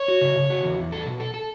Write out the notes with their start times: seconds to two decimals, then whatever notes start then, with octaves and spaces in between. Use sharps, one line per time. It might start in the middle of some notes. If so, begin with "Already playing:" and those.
Already playing: C#5
0.08 F#4
0.21 C#3
0.36 C#3
0.50 F#4
0.64 E2
0.78 E2
0.92 A4
1.06 B2
1.20 A4
1.34 A4